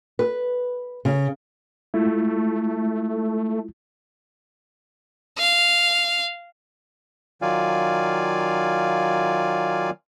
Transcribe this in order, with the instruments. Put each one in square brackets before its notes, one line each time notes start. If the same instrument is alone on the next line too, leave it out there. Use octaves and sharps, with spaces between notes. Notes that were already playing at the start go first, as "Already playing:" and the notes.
[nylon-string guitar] B4
C#3
[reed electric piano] G#3 E4 F4 [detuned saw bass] A3
[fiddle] F5
[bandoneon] D#3 F#3 F4 D5 F5 G#5